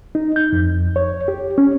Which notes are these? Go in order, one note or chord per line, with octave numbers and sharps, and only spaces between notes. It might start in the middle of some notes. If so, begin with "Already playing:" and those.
D#4
G6
F2
C#5
G4
C#4